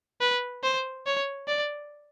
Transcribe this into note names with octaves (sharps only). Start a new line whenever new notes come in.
B4
C5
C#5
D5